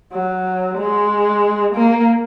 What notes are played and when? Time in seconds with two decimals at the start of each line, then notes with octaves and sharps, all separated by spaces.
0.13 F#3
0.77 G#3
1.75 A#3